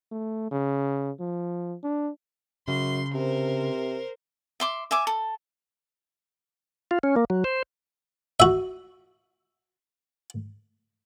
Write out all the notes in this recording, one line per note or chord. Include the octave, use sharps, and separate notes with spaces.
A3
C#3
F3
D4
F#2 C#3 C6
C3 A#4 C5
E5 C6 D6
E5 G#5 D6
A4
F4
C#4
A#3
F#3
C5
F#4 E5